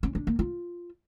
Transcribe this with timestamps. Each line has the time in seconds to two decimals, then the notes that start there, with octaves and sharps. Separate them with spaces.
0.03 C#4
0.15 D4
0.27 A#3
0.39 F4